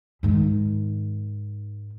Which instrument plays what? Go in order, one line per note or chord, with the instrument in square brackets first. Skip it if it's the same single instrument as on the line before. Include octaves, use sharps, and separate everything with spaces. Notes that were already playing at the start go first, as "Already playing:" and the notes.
[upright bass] G#2 D#3